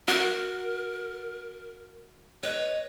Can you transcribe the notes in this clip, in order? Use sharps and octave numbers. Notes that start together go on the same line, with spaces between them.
F#4 A#4
B4 C#5 D#5